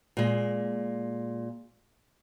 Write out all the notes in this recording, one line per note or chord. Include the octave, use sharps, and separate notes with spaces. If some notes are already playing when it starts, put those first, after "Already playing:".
A#2 G#3